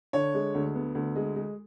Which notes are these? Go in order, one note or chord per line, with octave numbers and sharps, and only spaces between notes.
D3 C#5
G#3
D2
B3
D2
G#3
G#3